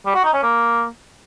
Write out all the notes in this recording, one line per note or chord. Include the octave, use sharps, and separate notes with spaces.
G3
F#4
D#4
C#4
A#3